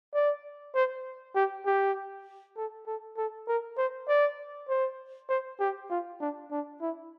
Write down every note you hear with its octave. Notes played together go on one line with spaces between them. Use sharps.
D5
C5
G4
G4
A4
A4
A4
A#4
C5
D5
C5
C5
G4
F4
D4
D4
E4